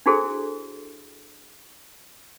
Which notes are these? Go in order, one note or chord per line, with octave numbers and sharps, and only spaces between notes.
D4 E4 F#4 G#4 A4 C5